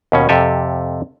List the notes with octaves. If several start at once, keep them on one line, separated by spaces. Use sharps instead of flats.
D#2 B2 C#4
F2 C3 G4 A4 G#5